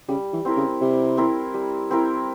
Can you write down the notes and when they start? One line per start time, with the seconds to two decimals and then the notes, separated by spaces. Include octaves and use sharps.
0.09 C#3 G3
0.33 E3
0.45 C4 E4 A#4
0.57 C#3
0.81 C3 G3
1.17 C4 E4 A#4
1.54 G3
1.91 C4 E4 A#4